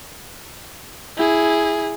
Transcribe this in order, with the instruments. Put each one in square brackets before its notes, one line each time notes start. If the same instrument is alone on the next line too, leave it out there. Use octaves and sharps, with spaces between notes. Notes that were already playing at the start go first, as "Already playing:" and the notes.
[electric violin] E4 G#4